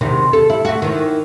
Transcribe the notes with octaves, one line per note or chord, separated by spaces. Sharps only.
E2 C3 D#3
A4
E4
A3 F#4
D#3 E3